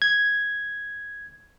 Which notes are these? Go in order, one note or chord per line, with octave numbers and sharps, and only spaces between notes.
G#6